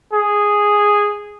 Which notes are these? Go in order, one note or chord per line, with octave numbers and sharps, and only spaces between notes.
G#4